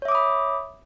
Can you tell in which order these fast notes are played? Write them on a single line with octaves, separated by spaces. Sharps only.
C#5 E5 D6 D#6 B5